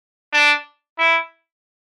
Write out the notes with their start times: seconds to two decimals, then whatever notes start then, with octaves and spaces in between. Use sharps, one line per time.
0.33 D4
0.99 E4